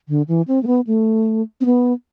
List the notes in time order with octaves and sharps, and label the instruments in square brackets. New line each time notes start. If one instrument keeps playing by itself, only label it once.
[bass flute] D3
E3
C4
A3
B3
A3
C4
B3